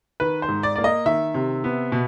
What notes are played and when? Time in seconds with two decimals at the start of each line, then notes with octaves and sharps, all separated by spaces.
0.20 D#3 B4
0.42 C5
0.48 G#2
0.63 D5
0.76 A#3 D5
0.84 D#5
1.06 D#3 E5
1.34 C3
1.64 B3
1.92 B2